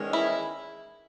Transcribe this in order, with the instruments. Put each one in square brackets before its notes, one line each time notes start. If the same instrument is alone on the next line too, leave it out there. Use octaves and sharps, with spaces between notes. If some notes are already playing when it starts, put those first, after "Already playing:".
Already playing: [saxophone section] E2 D#3 G#3 C#4
[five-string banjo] E4